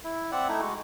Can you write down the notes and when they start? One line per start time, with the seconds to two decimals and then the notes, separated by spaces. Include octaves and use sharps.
0.04 E4
0.32 C4 D5 E5 F#5
0.49 A3 D#4 E4
0.61 G#3 F#4